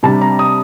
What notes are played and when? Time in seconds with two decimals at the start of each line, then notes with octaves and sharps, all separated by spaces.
0.03 C3 G3 D4 A5
0.21 A#5
0.39 D#6